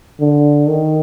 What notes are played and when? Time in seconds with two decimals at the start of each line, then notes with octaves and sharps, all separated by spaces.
0.20 D3
0.67 D#3